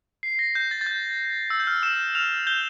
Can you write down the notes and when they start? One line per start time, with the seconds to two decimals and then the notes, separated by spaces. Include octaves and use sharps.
0.23 C7
0.39 A#6
0.55 G6
0.71 A6
0.81 A6
0.86 G6
1.50 E6
1.60 G6
1.67 F6
1.83 E6 E7
2.15 F6 F7
2.47 G6 G7